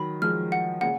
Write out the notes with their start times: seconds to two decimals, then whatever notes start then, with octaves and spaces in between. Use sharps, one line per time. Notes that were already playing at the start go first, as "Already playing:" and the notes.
Already playing: D#3 F#3 B5
0.22 F3 G#3 F6
0.52 F#5
0.81 A#2 C#3 F#5